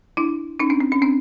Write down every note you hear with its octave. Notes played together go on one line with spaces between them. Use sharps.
D4 E4
C#4 D#4
C4 D4
C4
C#4
C4 D4